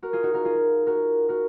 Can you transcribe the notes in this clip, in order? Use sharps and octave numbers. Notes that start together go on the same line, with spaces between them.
F#4 A#4
F4 G#4
D#4 F#4
F#4 A#4
F4 G#4
F#4 A#4
F#4 A#4